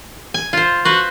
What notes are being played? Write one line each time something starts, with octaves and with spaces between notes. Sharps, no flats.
G#5
F4 C5
F#4 B4 C5